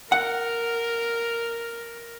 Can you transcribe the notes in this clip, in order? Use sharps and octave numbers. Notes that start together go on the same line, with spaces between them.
A#4 F#5